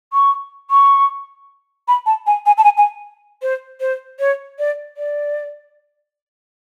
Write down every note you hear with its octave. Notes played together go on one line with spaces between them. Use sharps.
C#6
C#6
B5
A5
G#5
G#5
A5
G#5
G#5
C5
C5
C#5
D5
D5